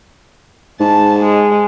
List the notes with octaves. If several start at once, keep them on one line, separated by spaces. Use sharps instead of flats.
G#2 A5
G#3